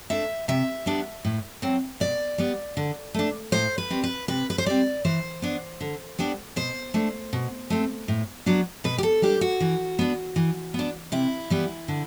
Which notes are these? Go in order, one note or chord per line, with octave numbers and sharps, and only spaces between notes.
A3 D4 E5
C3 E5
G3 B3 D4
A2
F#3 C4
B2 D5
G3 B3
D3
A3 D4
A2 C5
B4
G3 C4
B4
C3 B4
B4
C5
G3 C4 D5
E3 C5
B3 D4
D3
G3 B3 D4
B2 C5
A3 D4
B2
A3 C4
A2
F#3 B3 D4
B2 B4
G4
A4
G3 D4 G4
F#4
E3
B3 D4
E3
B3 D4
C3 E4
E3 G3 B3
D3